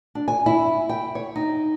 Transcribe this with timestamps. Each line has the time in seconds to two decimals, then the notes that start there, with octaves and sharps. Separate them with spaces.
0.15 D4
0.28 G#5
0.46 E4
0.89 G5
1.15 C#5
1.36 D#4